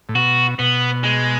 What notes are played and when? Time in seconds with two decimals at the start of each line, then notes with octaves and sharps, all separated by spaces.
0.09 A2
0.15 B2 F#4
0.59 B2 B3
1.04 G#3